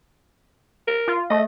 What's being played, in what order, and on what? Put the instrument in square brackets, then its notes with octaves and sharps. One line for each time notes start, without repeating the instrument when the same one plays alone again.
[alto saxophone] A#4
[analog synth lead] F4
[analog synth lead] A3 [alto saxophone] D#5